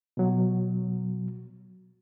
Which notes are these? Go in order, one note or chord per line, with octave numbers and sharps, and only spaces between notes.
B2 F#3